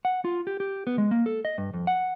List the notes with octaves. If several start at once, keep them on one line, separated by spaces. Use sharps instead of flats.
F#5
F4
G4
G4
B3
G#3
A#3
A4
D#5
G2
F2
F#5